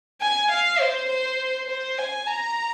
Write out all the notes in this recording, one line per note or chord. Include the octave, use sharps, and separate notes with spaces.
G#5
F5
C5
C5
C5
G#5
A#5